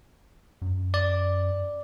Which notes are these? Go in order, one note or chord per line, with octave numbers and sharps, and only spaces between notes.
F#2
D5